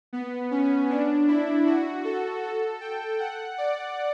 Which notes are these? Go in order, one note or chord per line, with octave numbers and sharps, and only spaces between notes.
B3
C#4
D4
E4
F#4
A4
A4
G5
F#5
D5